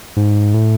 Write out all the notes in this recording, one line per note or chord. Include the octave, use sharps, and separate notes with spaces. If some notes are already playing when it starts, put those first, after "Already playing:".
G#2
A2